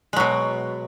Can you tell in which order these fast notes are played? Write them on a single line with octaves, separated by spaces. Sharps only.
G#3 F#3 B2